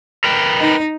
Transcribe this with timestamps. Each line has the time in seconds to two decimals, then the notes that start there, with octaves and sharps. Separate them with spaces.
0.24 A#4 B4 G5
0.60 D#4